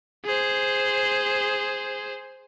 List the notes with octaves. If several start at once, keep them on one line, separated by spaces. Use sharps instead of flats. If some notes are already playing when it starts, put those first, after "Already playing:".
G#4 C5